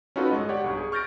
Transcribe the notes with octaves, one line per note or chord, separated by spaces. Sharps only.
C#4 D#4 F4 F#4 A4 B4
G1 G#3 A4 D#5
G4 C#5 D5 F#5
B1 G2 C#6
G#4
C#6 F6 G6 A6 A#6 D7